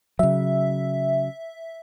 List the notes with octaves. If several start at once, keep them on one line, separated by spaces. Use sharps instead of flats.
C#3 F#3 E5